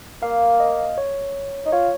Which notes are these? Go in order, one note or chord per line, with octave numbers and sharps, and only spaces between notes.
A#3 F5
D#5
C#5
D#4
F4 C#5